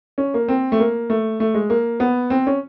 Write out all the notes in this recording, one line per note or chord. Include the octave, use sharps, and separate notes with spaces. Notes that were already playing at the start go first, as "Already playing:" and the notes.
C#4
A#3
C4
A3
A#3
A3
A3
G#3
A#3
B3
C4
C#4